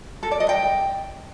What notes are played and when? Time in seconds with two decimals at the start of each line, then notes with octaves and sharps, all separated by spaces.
0.23 A4
0.31 D5
0.40 D#5
0.49 G5